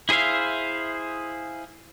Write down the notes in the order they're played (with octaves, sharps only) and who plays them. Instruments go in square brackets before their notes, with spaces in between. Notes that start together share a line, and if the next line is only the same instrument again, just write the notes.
[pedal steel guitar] E4 G#4 C5 E5 F5